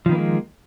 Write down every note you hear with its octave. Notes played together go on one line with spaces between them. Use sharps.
D#3 F3 G#3 A#3 B3